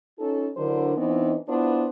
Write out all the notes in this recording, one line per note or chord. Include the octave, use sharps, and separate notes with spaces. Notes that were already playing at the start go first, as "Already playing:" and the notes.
C#4 D#4 F4 A4
D3 F#3 D4 E4 A#4 C5
E3 B3 C4 D4 D#4
B3 D4 E4 F4 B4 C5